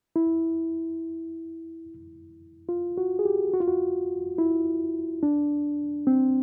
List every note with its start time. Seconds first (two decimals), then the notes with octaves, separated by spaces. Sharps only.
0.16 E4
2.69 F4
2.98 F#4
3.19 G#4
3.25 G4
3.53 F#4
3.60 F4
3.68 F#4
4.38 E4
5.23 D4
6.07 C4